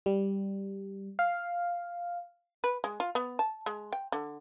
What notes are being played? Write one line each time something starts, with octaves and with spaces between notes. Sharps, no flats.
G3
F5
B4
G#3
F4
B3
A5
G#3
G5
D3